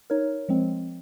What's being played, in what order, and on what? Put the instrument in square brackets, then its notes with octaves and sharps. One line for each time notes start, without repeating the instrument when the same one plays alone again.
[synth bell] D#4 A#4 C#5
F3 G#3 C4